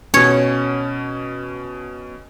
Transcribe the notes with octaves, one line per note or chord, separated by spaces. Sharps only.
B2 C#4 C#5